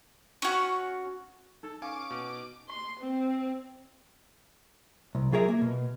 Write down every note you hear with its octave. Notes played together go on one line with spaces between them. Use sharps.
C#4 F#4
D#4 A4
C#4 F5 G#5 D6
B2
C6
C4
C2
F#3 F4 G#4 A#4 E5
A#3
B2